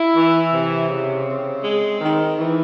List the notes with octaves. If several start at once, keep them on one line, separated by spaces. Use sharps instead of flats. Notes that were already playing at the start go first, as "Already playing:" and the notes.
Already playing: E4
E3
C3
C#3
C4
G#3
D#3
E3